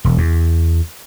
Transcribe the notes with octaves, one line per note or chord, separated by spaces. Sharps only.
E1
E2